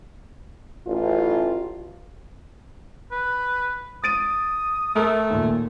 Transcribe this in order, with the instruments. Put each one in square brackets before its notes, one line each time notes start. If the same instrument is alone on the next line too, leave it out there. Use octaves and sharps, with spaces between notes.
[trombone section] A1 [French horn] F4
[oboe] B4
[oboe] D#6 [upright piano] A6 D7 D#7
[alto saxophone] A3 [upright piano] A4 A#4
[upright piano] D#2 A#2